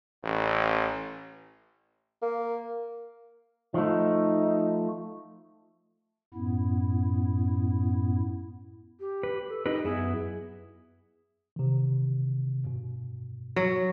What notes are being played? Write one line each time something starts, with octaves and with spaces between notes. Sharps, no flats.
A1
A#3
F3 A3 D#4
F#2 A2 B3 E4
G4
B4
A4
D#4 G4 B4 D#5
F#2 B3 E4 G#4
C3 D#3
G2 B2
F#3